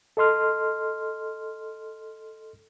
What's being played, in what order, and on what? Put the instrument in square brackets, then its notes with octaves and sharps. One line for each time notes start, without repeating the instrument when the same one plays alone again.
[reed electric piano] A4 D#5 C6 F6